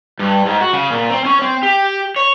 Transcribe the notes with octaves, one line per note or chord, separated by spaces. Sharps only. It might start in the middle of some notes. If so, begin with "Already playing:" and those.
G2
G#2
F#4
C#3
A#2
C4
C#4
C4
G4
C#5